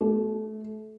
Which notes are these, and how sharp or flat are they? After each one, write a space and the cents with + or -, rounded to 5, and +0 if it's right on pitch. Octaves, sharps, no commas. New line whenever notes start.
A3 -25